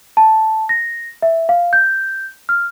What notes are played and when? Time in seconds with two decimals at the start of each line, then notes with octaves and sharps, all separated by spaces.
0.17 A5
0.69 A#6
1.22 E5
1.49 F5
1.73 G6
2.49 F6